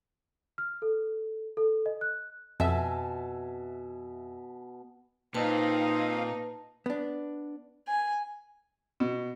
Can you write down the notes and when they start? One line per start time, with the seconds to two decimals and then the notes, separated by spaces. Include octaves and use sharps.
0.58 F6
0.82 A4
1.57 A4
1.86 D#5
2.01 F#6
2.60 F2 B2 E5 G#5 A5
5.34 A#2 C4 D#4 B4 F5 A5
6.86 B3 D4
7.88 G#5
9.00 B2